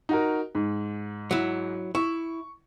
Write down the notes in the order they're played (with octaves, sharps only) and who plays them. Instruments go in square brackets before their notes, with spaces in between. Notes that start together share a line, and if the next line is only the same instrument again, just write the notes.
[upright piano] D#4 F#4 A#4
G#2
[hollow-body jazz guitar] F#3 E4
[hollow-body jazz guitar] E4 [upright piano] C#6